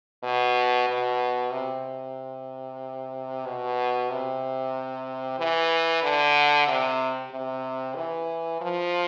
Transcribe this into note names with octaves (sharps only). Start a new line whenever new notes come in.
B2
B2
C3
B2
C3
E3
D3
C3
C3
E3
F3